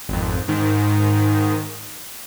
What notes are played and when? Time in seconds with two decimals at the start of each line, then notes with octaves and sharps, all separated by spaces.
0.09 G#1 F2
0.48 G#2 D#3